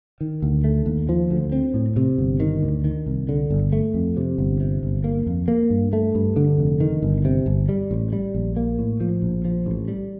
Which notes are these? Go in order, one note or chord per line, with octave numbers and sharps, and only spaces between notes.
D#3
D2
A3
D#2
F3
D2
C4
A2
C3
G1
D#3
D2
D#3
C2
D3
G1
A3
F2
C3
G1
C3
G1
A#3
F2
A#3
G2
A3
G2
D3
F1
D#3
G1
C3
G1
G3
A1
G3
A#1
A#3
A2
F3
A#1
F3
A1
G3